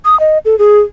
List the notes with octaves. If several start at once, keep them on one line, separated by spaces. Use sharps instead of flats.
D#6
D#5
A4
G#4